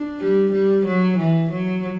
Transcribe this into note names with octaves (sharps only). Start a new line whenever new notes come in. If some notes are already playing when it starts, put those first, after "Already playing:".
Already playing: D4
G3
G3
F#3
E3
F#3